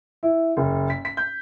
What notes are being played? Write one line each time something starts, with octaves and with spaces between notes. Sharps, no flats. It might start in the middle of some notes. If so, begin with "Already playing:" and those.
E4
F#1
B6
B6
G6